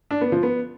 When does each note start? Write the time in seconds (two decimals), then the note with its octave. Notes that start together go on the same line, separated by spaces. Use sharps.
0.11 D4
0.21 B3
0.32 F3
0.43 B3